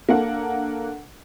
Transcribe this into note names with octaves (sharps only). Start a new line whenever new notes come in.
A#3 D4 A4 F#5